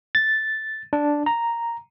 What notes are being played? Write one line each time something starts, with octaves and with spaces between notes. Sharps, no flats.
A6
D4
A#5